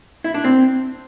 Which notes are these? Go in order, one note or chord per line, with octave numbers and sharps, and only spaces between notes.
E4
D4
C4